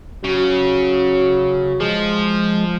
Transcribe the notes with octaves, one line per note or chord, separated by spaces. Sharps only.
C#3 F#3
F3 G#3